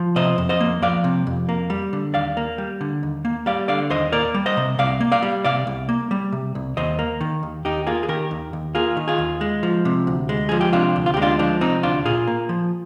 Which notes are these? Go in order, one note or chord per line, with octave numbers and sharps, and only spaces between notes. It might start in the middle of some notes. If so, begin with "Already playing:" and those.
Already playing: F3
C3 C5 D#5
F2
C5 D#5
A#3
F3 D5 F5
C3
F2
A#3
G3
D3
D#2 D5 F5
A#3
G3
D3
D#2
A#3
G3 D5 F5
D3 D5 F5
D#2 C5 D#5
A#3 A#4 D5
G3
C5 D#5
C3
C2 D5 F5
A#3
D5 F5
G3
C3 D5 F5
C2
A#3
G3
C3
C2
D#2 C5 D#5
A#3
D#3
D#2
D#2 D#4 G4
A#3 F4 G#4
G#4
D#3 G4 A#4
D#2
D#2
A#3 F4 G#4
D#3
F4 G#4
D#2
G#3
F3
C3
D2
G#3
F3 G#4
G4
C3 D4 F4
D2
F4
G#3 G4
D4 F4
F3 D4
C3 C4 D#4
D2 D4 F4
A#2 F4 G#4
A#3
F3